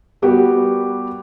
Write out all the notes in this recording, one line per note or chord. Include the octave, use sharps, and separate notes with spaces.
G3 B3 F#4 G4 A#4